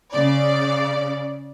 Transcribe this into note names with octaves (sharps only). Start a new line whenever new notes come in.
C#3 D5